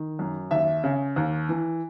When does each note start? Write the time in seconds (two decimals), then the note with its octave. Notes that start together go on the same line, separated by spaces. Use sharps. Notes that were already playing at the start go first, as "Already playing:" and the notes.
Already playing: D#3
0.19 F#2
0.51 D#2 E5
0.84 C#3
1.16 D#2
1.49 E3